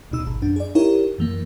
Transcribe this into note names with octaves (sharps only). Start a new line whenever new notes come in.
D2 B2 D#4 E6
G#1
F#2 D4
G#4 D5
D#4 E4 G4 A#4 C#5
F#2 E3 A#3